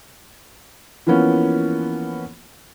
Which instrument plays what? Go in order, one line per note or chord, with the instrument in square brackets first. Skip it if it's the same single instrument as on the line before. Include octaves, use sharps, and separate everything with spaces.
[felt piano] E3 F3 A#3 B3 C#4